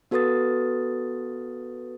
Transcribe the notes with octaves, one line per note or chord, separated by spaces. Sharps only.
B3 F#4 A4 B4 D#6 A6